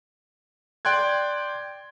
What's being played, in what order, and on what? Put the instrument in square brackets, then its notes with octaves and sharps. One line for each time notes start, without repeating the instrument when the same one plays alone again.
[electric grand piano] D5 G5 C6 F#6 G#6